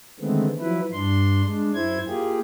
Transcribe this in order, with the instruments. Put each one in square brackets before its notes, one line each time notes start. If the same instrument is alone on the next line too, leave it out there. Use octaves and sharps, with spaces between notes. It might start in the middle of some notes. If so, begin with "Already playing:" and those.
[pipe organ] D3 D#3 G#3 A3 B3 C4
F3 F#3 E4 B4
G2 D4 C6
G#3 D4
F#2 E4 C5 G#6
A#3 F4 G4 G#4